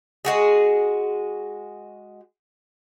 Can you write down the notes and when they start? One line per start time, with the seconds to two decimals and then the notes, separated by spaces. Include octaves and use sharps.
0.25 G#3 F#4 G#4